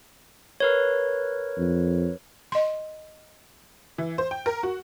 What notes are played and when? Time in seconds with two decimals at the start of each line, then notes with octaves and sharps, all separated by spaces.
0.60 A#4 B4 C#5
1.58 F2
2.52 D#5 C6
3.98 E3
4.18 C5
4.31 G5
4.46 A#4
4.63 F#4